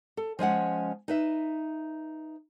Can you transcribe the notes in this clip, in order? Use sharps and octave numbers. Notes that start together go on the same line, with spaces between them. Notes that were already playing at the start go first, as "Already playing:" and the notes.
A4
F3 G#3 C#4 F#5
D#4 B4 E5